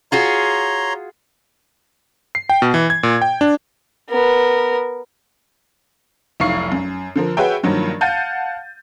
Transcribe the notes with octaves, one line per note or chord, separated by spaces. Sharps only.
F4 F#4 G#4 C#5 A#5 C6
C7
G5
B2
E3
G#6
A#2
G5
D4
B3 A#4
F1 B1 E4 F5 C#6 C7
F#2
D3 F3 A#4
F#4 G#4 B4 C#5 E5 G5
G2 D#3 F3 F#3 A#3
F5 F#5 A5 G6 A6 D#7